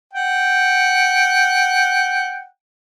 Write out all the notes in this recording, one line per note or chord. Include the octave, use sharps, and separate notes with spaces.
F#5 G5